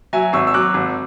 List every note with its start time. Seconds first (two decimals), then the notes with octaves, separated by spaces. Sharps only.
0.13 F#3 E5 G#5
0.33 G#1 C#6 E6
0.47 E6
0.54 F#3 D6 F#6
0.74 G#1